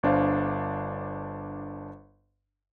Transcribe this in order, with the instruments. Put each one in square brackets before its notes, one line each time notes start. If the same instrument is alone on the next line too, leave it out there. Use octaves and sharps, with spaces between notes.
[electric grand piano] G1 D4 C5 F5